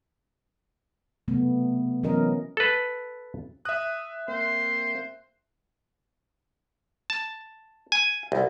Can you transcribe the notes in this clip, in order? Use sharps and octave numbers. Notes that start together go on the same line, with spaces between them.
C3 F#3 A3 B3
E3 F#3 B3 C#4 A#4 D#5
A4 B4
E5 D#6 F#6
A#3 C4 C5
A5
G#5
C2